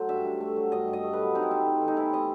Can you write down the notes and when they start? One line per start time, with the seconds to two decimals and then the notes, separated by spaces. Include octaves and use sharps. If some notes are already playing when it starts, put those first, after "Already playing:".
Already playing: F#3 A3 C5
0.09 G2 E5
0.25 G2
0.41 A3
0.56 F#3
0.72 G2 D#5
0.88 G2
0.93 D#5
1.03 A3
1.13 B4
1.19 F#3
1.35 C4 D#4
1.43 E4
1.51 C3 D#4
1.66 A3
1.82 E3
1.88 D#4
1.97 C4 E4
2.13 C3 D#5